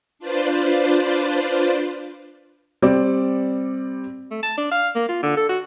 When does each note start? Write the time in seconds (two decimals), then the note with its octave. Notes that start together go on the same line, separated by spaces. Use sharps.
0.19 D4 F4 B4 C5 D5
2.82 G3 C4 D5
4.31 A3
4.43 A5
4.58 D4
4.72 F5
4.95 A#3
5.09 F4
5.23 D3
5.37 A4
5.49 F#4